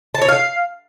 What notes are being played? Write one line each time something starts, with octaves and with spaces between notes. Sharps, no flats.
A5
C#5
F5